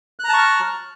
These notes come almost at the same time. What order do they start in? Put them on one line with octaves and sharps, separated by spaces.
F#6 A#5 A5 C#6 F6